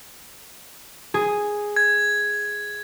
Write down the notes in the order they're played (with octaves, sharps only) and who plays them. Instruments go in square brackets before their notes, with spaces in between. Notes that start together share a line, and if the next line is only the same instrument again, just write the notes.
[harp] G#4
[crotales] G#6